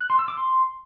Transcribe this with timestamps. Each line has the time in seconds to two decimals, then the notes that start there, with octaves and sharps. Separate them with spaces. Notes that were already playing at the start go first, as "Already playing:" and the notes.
0.01 F#6
0.10 C6
0.19 E6
0.28 D6
0.37 C6